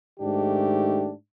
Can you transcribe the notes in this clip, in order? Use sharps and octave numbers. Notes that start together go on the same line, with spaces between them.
G#2 D#3 A3 D4 G4